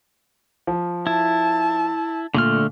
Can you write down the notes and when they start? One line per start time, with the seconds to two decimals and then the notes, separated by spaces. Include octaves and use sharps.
0.67 F3
1.07 E4 A5
2.35 A#2 D3 A3 F6